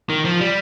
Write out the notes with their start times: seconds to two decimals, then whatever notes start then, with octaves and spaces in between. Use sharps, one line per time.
0.09 D#3
0.25 F3
0.40 G3